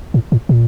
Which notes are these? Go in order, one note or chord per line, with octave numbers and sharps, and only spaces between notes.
A2
A2
A#2